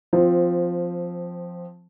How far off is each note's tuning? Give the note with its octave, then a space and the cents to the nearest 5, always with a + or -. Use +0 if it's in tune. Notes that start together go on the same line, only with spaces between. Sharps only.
F3 +5 C4 -10